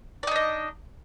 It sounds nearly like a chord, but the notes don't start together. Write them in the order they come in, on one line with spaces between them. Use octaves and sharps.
D5 D#4 D4 D#5